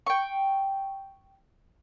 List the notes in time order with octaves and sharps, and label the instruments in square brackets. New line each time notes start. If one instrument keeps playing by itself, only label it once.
[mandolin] G5 C#6